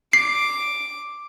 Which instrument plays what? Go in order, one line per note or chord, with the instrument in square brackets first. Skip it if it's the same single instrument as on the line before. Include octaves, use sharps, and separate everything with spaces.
[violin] D6 [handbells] C7